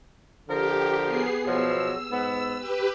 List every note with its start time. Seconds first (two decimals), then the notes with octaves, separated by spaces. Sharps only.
0.49 D3 F3 G4 A#4
1.04 B3 G#4 C7
1.45 B2 F3 F#3 E6
2.11 G#2 B3
2.57 G4 B4